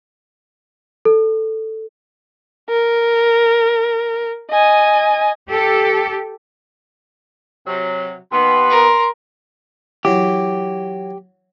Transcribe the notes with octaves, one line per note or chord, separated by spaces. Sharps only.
A4
A#4
D#5 G#5
G4 A4
C3 F#3
D#2 B3 C6
A#4
E3 F#3 E4 G4